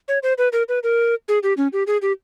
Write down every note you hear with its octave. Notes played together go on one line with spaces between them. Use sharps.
C#5
C5
B4
A#4
B4
A#4
G#4
G4
C#4
G4
G#4
G4